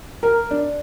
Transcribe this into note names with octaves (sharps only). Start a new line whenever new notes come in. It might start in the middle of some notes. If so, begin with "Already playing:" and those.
A#4
D4